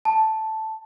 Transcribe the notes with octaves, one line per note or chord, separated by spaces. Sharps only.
A5